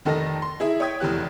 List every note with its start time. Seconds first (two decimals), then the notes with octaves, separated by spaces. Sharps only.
0.05 F1 D#3 A4 D#5 A#6
0.42 C6
0.60 E4 G#4 E5
0.80 C#5 G5 D#6 G#6 B6
1.00 F1 E2 G4 F#6